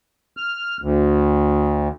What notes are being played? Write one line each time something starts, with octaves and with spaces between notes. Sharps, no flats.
F6
D2